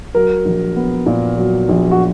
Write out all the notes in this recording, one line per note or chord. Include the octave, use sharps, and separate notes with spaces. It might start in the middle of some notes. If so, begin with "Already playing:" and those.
F#3 A#4
A#1
B3
A#2
F#3
A#1
F#4